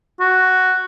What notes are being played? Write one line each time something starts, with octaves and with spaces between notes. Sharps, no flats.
F#4